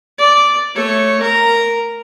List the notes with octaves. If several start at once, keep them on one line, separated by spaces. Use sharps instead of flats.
D5
A3 C#5
A#4 A#5